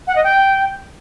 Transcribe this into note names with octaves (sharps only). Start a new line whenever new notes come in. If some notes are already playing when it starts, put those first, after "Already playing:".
F#5
D#5
G5